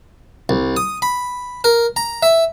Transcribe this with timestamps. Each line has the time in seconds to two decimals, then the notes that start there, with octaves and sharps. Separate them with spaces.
0.49 C2
0.76 D#6
1.02 B5
1.64 A#4
1.96 A#5
2.23 E5